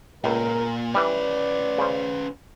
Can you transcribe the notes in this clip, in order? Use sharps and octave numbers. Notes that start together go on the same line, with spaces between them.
C#2 A#2 A#4
E3 G3 C#4 B4 D5
C#3 C5